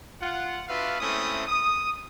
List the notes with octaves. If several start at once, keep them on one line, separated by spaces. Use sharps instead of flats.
F4 F#5
D4 F4 F#4 B4 E5 F5
G#3 A3 C4 C#4 E4 D#6
D#6